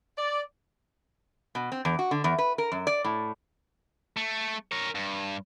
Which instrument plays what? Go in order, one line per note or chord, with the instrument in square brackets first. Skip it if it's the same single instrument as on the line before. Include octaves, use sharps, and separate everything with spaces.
[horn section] D5
[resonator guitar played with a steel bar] B2
C4
E2
F#4
D3
E2
B4
A#4
F#2
D5
A2
[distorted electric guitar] A3
A#4 C#5
G2